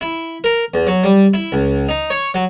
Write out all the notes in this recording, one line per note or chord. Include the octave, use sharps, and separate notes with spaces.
E4
A#4
E2
F#3
G3
E4
C#2
D#4
C#5
F#3